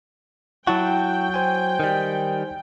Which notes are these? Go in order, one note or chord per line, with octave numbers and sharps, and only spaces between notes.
F#3 E4 F#4 G5 A5
C5 G#5
D#3 G3